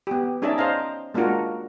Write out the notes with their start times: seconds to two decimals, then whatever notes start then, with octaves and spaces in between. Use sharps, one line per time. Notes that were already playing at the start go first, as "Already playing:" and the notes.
0.07 B3 G4
0.42 C#4 D#4 G#4 D5 E5 A5
0.58 C5 D#5 F5 A#5
1.14 G#3 A#3 D4 F4 F#4 A#4